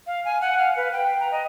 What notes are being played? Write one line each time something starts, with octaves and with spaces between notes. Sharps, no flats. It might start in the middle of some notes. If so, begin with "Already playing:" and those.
F5
G#5
F#5
F5
B4
G5
A#5
D#5